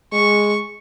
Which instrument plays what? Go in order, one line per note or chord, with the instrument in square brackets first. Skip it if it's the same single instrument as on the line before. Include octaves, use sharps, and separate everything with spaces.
[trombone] G#3 [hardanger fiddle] C#6